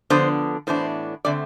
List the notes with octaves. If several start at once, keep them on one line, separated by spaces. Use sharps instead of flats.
D3 F3 B3 D4 C5
A2 E3 B3 D4 C5
D3 A3 C4 D5